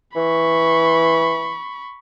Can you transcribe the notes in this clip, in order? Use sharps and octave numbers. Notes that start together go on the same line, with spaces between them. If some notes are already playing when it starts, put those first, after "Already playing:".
E3 B5 C#6